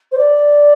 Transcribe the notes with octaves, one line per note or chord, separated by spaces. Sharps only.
C5
D5